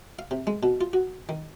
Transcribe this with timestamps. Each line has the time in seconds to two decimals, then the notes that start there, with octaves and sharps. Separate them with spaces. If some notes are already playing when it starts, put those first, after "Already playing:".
0.19 F5
0.31 C3
0.47 G#3
0.63 B2
0.81 F4
0.93 F#4
1.29 D#3